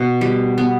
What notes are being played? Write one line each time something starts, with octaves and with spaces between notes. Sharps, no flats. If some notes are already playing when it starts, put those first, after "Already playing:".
Already playing: B2
G3
B3